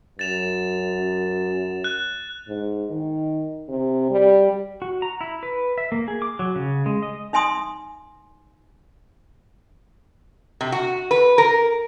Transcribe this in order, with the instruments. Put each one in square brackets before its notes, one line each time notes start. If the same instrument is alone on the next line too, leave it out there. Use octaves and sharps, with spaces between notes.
[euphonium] F#2 [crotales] A6 E7 F7
[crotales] F#6
[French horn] G#2
D#3
C3
G3
[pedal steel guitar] F#4
A#5
E4
B4
E5
A#3
G#4
D6
F#3
C#3
G#3
D#5
[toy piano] D#4 E5 G#5 C6 D#6
[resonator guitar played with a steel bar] C3
F#4
B4
A#4